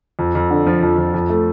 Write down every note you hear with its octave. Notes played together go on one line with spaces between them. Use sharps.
F2
F2
D3
F3
F2
F2
F2
A3